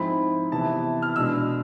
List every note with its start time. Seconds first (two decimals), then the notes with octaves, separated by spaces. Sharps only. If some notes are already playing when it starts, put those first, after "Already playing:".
Already playing: G#2 F3 G#3 C4 E4 B5
0.51 C3 E3 B3 E4 A5
1.02 F6
1.16 B2 G#3 D4 E6